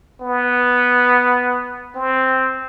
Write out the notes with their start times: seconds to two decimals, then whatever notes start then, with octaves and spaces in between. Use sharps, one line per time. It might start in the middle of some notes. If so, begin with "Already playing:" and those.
0.21 B3
1.95 C4